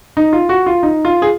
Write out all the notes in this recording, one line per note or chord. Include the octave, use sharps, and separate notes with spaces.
D#4
F4
F#4
F4
D#4
F4
G#4